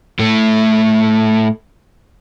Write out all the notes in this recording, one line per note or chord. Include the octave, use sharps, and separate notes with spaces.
A2 A3